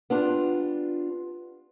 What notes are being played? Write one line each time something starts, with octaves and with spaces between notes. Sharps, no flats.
B3 D4 F4 G4